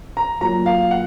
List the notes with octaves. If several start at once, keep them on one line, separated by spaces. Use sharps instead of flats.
A#5
A#2 F#3 A#5
F5
F#5